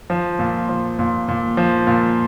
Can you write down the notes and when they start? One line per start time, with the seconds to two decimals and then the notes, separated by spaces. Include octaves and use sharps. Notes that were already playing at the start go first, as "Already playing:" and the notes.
0.10 F3
0.39 A#2
0.69 F3
0.99 A#2
1.28 A#2
1.57 F3
1.87 A#2